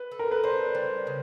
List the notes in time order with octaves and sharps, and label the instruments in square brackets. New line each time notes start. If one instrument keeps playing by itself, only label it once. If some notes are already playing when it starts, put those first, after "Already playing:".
Already playing: [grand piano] B4
[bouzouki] A4
[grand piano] A#4
B4
[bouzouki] D4 [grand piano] C5
[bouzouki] G3
C#3